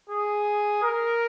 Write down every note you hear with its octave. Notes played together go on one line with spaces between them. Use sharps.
G#4
A#4